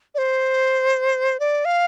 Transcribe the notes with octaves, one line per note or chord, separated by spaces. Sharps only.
D5
C5
D5
F5